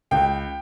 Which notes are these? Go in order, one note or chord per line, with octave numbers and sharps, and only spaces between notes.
C#2 G5